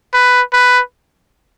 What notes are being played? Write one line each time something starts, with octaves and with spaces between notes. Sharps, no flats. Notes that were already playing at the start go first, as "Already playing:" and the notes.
B4
B4